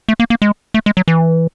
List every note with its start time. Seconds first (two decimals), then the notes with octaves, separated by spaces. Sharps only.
0.09 A3
0.20 A#3
0.30 A#3
0.42 G#3
0.74 A3
0.86 G#3
0.97 F#3
1.08 E3